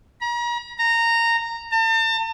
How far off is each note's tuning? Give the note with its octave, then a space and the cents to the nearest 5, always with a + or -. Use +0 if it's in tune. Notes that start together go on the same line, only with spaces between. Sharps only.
A#5 +40
A#5 -15
A5 +40